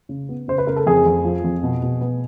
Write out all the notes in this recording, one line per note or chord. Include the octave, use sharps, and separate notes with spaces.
C#3
B3
C#3 C5
B4
C#3 A#4
A4
F2 G#4
F2
F3
F2
B2
B2
B3